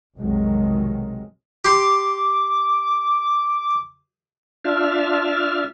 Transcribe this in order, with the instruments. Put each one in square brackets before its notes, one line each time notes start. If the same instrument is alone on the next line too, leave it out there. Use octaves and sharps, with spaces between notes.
[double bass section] F1 B1 C3 D#3 F#3 G#3
[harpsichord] G4 C6 [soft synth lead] D6
[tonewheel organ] D4 F4 E5 F6